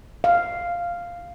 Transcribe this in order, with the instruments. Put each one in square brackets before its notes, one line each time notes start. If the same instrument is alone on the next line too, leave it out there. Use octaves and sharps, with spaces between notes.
[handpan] F5